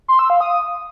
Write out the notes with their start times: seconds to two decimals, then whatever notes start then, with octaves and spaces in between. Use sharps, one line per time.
0.08 C6
0.19 E6
0.30 F5
0.40 D#6